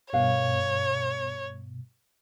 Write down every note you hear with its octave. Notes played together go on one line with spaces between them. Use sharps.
G2 B2 A#4 B4 C#5 F5